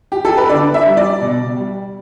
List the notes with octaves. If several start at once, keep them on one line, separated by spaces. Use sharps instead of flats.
G4
A4
B4
D3 D5
E5
G3
D5
B2
G3